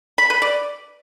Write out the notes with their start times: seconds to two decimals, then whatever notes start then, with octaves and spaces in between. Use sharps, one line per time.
0.18 B5
0.30 B4
0.42 D5